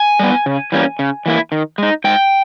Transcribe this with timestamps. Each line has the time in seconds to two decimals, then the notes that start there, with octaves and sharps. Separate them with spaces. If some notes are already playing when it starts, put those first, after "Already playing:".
Already playing: G#5
0.19 G3 B3
0.46 C#3
0.72 E3 G3 A#3 C#4
0.99 C#3
1.26 E3 A#3 E4
1.52 D#3
1.78 G#3 D#4
2.04 G#2 G5